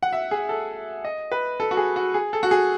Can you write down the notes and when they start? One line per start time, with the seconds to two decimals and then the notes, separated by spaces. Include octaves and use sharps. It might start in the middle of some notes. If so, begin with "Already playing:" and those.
0.03 F#5
0.13 E5
0.31 G#4
0.49 A4
1.05 D#5
1.32 B4
1.60 A4
1.71 F#4
1.77 G#4
1.96 F#4
2.14 G#4
2.33 A4
2.43 F#4
2.51 G#4